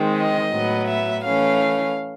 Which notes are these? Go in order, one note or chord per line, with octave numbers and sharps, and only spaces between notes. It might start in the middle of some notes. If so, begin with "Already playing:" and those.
Already playing: D#3 G#3 C4
D#5
A2 F#3 B3
E5
E3 A3 C#4 F5